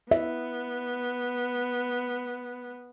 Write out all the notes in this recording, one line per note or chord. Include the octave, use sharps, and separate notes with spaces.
B3 E5